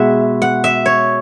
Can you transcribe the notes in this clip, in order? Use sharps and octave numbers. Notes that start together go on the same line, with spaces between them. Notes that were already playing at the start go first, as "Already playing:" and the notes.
Already playing: B2 G#3 E5 F#5
F#5
E5
C#5